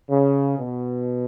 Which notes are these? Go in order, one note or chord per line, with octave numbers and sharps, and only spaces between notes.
C#3
B2